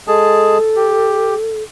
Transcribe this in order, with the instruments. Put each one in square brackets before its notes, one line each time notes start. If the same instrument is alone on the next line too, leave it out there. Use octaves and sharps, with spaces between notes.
[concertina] G#3 G#4 A5 [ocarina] A4
[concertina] G4